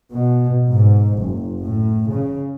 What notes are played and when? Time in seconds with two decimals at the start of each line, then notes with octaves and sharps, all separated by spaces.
0.14 B2
0.70 G#2
1.17 F#1
1.62 A2
2.11 C#3